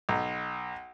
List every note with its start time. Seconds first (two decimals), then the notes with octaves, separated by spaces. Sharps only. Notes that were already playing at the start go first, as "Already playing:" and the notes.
0.09 B1